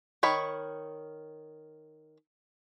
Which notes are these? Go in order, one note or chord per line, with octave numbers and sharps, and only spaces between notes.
D#3 C#5 B5